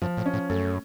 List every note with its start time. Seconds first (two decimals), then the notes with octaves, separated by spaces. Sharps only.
0.02 F#2 F3
0.18 A2
0.26 C#4
0.34 A2
0.50 F#2 A3